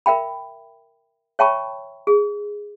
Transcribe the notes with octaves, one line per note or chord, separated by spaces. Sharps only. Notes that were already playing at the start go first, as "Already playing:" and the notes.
A#4 E5 G5 B5
C#5 E5 G5 A5 B5 C#6
G#4